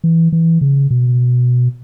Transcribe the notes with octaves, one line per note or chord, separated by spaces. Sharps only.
E3
E3
C#3
B2